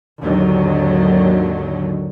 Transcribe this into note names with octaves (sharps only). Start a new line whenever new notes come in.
G#1 D#2 D3 D#3 F#3